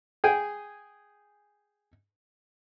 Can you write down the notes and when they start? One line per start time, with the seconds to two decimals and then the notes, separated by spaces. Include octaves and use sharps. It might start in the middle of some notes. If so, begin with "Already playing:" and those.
0.24 G#4 G5 G#5